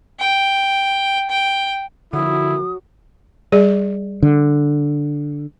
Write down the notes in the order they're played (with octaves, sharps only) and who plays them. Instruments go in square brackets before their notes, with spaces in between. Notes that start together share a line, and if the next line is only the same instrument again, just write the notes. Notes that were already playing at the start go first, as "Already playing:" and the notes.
[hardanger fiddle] G5
G5
[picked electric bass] D3 F3 [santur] F#3 F#4 [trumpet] E4 [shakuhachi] D#6
[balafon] G3 G#4 D5
[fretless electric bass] D3